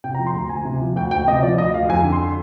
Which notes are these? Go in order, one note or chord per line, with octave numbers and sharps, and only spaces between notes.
C3 G5
A#5
F3
C6
D2 A#5
D2 G#5
C3
F3
D2 G5
D2 G5
C3 D#5
F3 D5
D2 D#5
D2 F5
F2 G#5
D3
C6